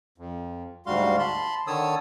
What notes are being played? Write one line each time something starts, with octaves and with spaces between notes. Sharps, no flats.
F2
D2 G#2 G3 F#4 F5 C6
A5 B5 C6
D3 D#3 C#5 A5 D#6 E6